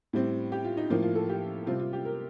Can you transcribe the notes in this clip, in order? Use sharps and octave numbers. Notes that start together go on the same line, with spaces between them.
A2 G3 C4
G4
F4
D#4
A2 F3 A#3 F4
F4
A4
G4
C3 G3 C4 F4
F4
G4
A#4